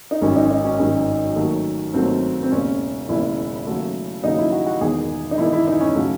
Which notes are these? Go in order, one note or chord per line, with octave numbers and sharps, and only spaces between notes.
D#4
G#1 F#2 D#3 C#4
D#4
D#4
C#4
G#1 F#2 D#3
D#2 D#3 F#3 A3
D#2 D#3 F#3 A3 C4
C4
E1 D#2 C#3 C#4
E1 D#2 C#3 E4
D#2 C#3 F#3 A3
D#2 C#3 F#3 A3 D#4
E4
F#4
F#4
E1 E2 D#3 G#4
D#4
E1 E2 D#3 E4
E4
D#4
C#4
C#3 F#3 A3